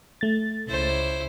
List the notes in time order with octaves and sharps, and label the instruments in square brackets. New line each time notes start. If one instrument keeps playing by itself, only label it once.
[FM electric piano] A3 A6
[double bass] C#2 [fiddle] E4 C5